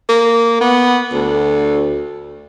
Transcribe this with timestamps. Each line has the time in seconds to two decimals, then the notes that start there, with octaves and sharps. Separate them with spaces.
0.09 A#3
0.60 B3
1.13 D2